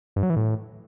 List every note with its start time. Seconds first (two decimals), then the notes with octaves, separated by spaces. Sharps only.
0.16 G2
0.23 F#3
0.30 E3
0.37 A2